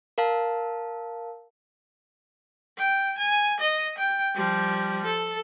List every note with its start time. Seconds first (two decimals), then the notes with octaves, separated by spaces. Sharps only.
0.18 A#4 F5 A5
2.78 G5
3.18 G#5
3.60 D#5
3.98 G5
4.35 F3 G3
5.05 A4